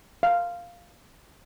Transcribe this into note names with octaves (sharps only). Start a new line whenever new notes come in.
F5